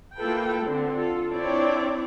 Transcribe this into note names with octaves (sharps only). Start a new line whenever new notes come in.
A#3 E4 F4 A4 B4 G5
D3 C4
F4 A4
C4 D4 E4 C#5 D5